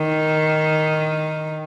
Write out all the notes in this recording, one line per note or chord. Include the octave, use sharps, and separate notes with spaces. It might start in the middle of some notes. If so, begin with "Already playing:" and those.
Already playing: D#3